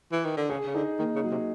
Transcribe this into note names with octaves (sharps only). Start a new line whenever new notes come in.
E3
D#3
D3
C#3 G#4
C#3
D3 D#4
D#3 A#3
C#3
F#3
C3